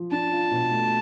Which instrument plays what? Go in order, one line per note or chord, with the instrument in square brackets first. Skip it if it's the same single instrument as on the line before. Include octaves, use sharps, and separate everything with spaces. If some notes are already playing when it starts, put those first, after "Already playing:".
Already playing: [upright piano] F3
[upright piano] D4 [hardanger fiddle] A5
[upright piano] F4
B2
A3